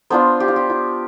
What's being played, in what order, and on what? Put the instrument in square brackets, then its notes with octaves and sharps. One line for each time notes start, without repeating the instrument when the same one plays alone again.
[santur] B3 D4 F4 C5
G4
F4
G4
F4